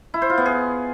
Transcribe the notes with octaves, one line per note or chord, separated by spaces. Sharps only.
E4
C5
F4
B3
G#4